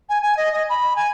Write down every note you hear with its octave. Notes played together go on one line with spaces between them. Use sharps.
G#5
G#5
D#5
D#5
B5
G#5